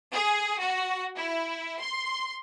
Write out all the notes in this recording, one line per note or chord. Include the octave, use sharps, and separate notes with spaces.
G#4
F#4
E4
C6